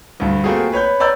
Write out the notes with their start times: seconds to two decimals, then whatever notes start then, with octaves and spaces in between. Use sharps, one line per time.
0.20 D2 G2
0.44 A3 A#3 C4 F4 F#4 G#4
0.72 B4 C#5 B5 G6
1.00 B4 C#5 D5 A#5 E6 G6